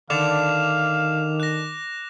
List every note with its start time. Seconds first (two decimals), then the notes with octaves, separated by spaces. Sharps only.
0.10 D3 D#3 D4 F5 D6 E7 F7
1.40 F#6 A#6